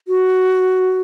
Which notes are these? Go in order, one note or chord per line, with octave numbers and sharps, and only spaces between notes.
F#4